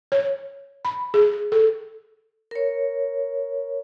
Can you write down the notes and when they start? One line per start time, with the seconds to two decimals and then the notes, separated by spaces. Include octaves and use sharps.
0.12 C#5
0.85 B5
1.14 G#4
1.52 A4
2.51 A#4 C#5